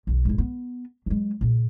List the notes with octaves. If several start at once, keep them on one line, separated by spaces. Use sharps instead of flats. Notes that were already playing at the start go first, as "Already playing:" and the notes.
B1 E2
G#2 E4
B3
F#3 G#3
A#2 C#3